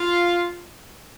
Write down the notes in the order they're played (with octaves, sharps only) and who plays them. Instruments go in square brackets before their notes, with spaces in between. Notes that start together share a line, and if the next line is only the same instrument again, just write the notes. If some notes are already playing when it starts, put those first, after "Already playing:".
Already playing: [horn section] F4